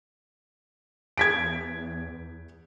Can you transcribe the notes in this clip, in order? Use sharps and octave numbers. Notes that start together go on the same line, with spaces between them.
E2 G#6 B6 D7